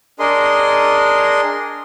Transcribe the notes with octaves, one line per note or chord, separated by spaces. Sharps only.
D4 G#4 A#4 D#5 C6